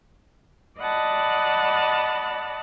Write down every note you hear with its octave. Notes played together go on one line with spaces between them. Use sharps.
D5 D#5 F#5 A5 B5